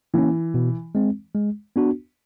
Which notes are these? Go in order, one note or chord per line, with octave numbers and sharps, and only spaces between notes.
E3 A#3 C#4
B2
G#3 C4
G#3
B3 D4 F#4